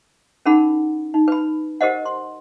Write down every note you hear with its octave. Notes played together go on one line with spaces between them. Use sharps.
C#4 D#4 G#4 A#4 F#5 B5
D#4
B4 B5
G4 A#4 C5 D#5 F#5
C6